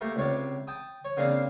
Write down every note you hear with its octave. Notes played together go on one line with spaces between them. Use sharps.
A3 A#3 G4
C#2 C3 C#5 D5
G5 A5 D#6
C#5
C#3 A#3 C4 D4 D5 F5